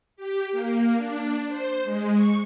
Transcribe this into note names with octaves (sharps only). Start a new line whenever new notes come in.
G4
A#3
D4
C5
G#3
C#6